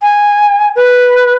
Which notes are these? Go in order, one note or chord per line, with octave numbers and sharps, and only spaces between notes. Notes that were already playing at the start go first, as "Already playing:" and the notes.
G#5
B4